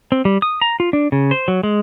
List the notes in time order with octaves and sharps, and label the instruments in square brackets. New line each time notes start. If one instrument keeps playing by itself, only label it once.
[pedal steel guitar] C4
G3
D#6
A#5
F4
D4
C#3
C5
F#3
G#3